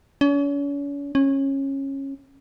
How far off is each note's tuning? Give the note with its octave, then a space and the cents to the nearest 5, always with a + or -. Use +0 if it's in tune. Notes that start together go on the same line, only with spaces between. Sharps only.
C#4 +40
C#4 -20